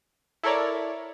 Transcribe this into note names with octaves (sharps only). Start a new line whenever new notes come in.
E4 A4 A#4 C#5 D5